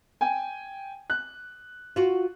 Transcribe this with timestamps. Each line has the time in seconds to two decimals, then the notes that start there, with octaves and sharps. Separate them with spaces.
0.21 G5 G#5
1.10 F#6
1.96 F4 F#4